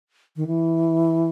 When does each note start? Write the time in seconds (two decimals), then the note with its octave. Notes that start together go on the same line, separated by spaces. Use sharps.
0.36 D#3
0.47 E3